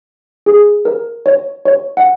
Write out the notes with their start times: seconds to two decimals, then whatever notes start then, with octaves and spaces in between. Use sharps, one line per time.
0.46 G#4
0.85 A#4
1.26 C#5
1.65 C#5
1.97 F#5